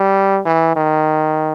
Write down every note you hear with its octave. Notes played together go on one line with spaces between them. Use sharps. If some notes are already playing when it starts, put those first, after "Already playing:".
Already playing: G3
E3
D#3